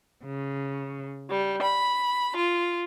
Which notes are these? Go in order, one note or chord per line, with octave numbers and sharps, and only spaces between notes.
C#3
G3
B5
F4